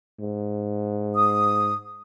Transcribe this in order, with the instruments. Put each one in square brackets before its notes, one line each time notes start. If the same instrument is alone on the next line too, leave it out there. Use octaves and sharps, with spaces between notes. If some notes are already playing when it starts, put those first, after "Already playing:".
[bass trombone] G#2
[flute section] D#6